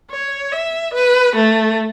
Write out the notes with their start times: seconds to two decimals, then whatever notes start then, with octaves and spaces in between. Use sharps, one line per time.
0.11 C#5
0.52 E5
0.94 B4
1.36 A3